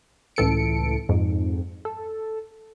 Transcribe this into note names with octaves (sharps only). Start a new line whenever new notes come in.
C#2 A2 E3 A4 C#7 D7
F2 G#2
A4